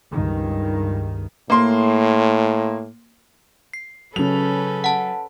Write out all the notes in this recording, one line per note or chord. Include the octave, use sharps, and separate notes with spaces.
C#2 G2 D#3
A2 A#3 C6
C7
C#3 F#3 C#4 A4 B4 F7
F#5 A5